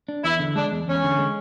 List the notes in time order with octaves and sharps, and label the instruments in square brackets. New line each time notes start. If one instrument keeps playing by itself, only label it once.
[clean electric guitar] D4
[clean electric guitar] E2 [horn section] E4
[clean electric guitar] D3
[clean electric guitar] G#3 [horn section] D4
[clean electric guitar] E2
[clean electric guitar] E2 [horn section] C#4
[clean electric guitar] D3
G#3